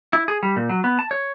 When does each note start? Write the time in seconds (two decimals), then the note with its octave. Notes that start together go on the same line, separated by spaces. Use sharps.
0.13 E4
0.28 G#4
0.43 G3
0.56 A#2
0.69 F#3
0.84 B3
0.99 A5
1.11 C#5